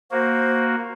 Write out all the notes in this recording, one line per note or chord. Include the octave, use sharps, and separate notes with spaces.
A#3 F#4 C5